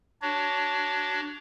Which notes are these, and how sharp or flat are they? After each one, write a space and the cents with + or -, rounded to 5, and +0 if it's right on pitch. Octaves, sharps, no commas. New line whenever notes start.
D4 +0 F#4 +20 C#5 +15